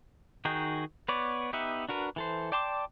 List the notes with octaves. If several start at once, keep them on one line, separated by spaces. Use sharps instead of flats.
D#3 D#4 F#4 G#4 G5
B3 B4 C#5 D5
B3 D#4 G4 E5 F#5
D4 F#4 A#4 B4
E3 A4 C5
D5 G5 A5 C6 D6